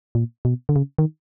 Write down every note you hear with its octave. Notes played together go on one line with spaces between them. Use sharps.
A#2
B2
D3
C#3
D#3